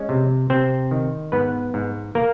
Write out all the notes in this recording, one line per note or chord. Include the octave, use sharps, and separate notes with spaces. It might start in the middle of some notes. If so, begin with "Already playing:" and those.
Already playing: G#3 C#4
C3
C3 C4 C5
D#3
G#2 B3 B4
G#2
A#3 A#4